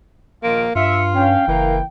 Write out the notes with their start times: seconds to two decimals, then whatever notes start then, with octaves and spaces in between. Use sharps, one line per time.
0.43 A#1 D#3 A#3 F4 D7
0.75 G2 F4 E5 C#7
1.14 C#4 F5 G5
1.48 F#1 E3 A#4 F5